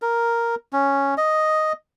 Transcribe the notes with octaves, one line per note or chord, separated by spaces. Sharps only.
A#4
C#4
D#5